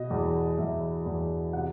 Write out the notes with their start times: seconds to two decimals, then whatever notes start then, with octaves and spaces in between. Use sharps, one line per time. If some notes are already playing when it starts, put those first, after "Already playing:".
Already playing: B2 D#5
0.10 E2
0.58 E2 E5
1.06 E2
1.53 C3 F#5